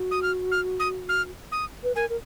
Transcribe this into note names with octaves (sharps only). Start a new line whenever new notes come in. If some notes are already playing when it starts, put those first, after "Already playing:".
Already playing: F#4
D#6
F6
F6
D#6
F6
D#6
B4
A#4 G#5
A#4